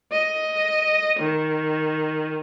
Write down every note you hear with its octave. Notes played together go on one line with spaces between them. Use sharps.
D#5
D#3